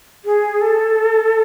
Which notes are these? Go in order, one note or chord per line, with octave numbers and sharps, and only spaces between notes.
G#4
A4